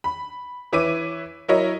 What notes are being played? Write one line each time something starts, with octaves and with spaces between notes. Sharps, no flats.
B5
E3 E4 C#5 D6 D#7
F#3 E4 A#4 C#5 D#5